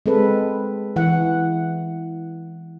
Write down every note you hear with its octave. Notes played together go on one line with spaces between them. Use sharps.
G#3 C4 A4 B4
E3 F#5